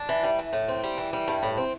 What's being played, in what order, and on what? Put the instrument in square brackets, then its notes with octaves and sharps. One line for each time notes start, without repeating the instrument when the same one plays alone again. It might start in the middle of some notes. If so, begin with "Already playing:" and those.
Already playing: [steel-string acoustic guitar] D4
E3
G3
E3
A2
C4
G3
E3
G3
G2
A2
C4